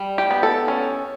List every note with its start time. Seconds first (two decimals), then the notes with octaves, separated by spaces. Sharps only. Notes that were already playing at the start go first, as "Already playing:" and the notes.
Already playing: G3
0.18 G4
0.31 B3
0.43 A4
0.68 C#4